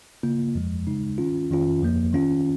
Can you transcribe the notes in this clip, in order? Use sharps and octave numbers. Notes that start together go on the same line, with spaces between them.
C#3 A#3 F4
F2 F3 G#3
C#3 G#3 D#4
D#3 C#4 F4
F2 D#3 C#4 F4
F2 F3 A#3
D#3 C#4 F4